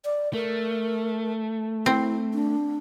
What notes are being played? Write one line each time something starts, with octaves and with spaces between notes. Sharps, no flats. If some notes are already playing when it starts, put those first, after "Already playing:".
D5
A3 A#4
C4 E4
D4